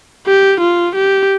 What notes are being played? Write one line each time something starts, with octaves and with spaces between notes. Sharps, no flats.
G4
F4
G4